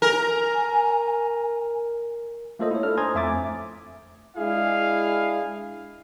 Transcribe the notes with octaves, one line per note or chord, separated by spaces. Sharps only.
A#4 G#5
A3 A#3 F4 A4 C5 D#5
E4 C#5
D4 A4 F6
C5 G#5 A#5 C6 D#6 G#6
F2 A3 E5 G#5 D6 A6
G#3 D4 E4 G#4 F5